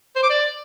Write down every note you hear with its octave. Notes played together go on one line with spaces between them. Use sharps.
C5
D6
D5